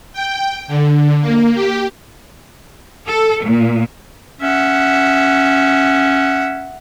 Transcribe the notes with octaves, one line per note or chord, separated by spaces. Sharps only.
G5
D3
A#3
G4
A4
A#2
C#4 E5 F#5